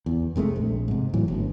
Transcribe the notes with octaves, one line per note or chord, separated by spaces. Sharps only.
E2
F1 C3 G#3 A3
A#1
G#2 C3
A2 E3 F#3
G1